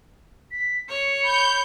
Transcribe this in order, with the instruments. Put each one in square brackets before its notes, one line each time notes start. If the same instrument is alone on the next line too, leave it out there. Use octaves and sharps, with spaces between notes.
[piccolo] B6
[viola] C#5 [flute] C#6 [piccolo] C#7
[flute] B5 [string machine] G6